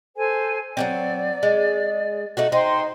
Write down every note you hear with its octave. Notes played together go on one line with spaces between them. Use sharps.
A4 C5 G#5
F#3 A#3 C4 D5
G#3
A3 D#4 F#4
D#4 C5 G5 C6